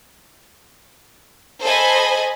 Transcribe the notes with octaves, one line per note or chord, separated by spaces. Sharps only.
A4 C5 D#5 G#5 B5